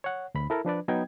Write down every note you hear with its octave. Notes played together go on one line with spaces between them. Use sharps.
C#5 F#5
D2 B5
E4 A4 A#4
F3 D4 B4 D5
F#3 B3 D#4 G5 G#6